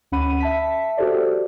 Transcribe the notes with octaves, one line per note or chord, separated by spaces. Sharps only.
D2 C#4 F#5 B5 D#7
E5 A5 B6
F#4 G4 A4 C5 D5